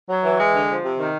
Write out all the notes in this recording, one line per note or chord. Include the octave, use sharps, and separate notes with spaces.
F#3
E3
G#3
D3
F3
C3
D#3